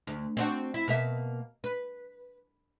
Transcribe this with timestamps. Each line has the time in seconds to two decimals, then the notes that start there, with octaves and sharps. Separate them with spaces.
0.07 D2
0.37 C4 D4 F#4
0.74 E4
0.88 B2 A#3 E5
1.64 B4